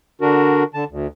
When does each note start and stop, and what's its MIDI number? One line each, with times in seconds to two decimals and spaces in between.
0.21 0.63 50
0.21 0.63 62
0.21 0.63 66
0.21 0.63 70
0.74 0.84 50
0.74 0.84 81
0.90 1.07 38